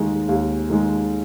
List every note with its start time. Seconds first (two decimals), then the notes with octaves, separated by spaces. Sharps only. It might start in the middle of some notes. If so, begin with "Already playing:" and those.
Already playing: D#2 D#3 G#3
0.29 D#2
0.70 D#3 G#3